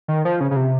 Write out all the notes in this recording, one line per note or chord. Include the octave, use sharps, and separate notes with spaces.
D#3
F3
C#3
C#3
C3